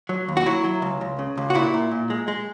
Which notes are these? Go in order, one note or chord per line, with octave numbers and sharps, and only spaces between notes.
F#3
D#2
F#4
F#3 E4
F#3
C#2
C#2
C#3
C#2
F#4
A#2 E4
A#2
A#2
G#3
G#3